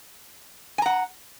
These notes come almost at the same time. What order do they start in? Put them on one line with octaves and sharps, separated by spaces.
G#5 A#5 F#5